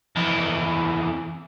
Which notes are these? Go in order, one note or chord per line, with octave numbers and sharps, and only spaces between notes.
F2 E3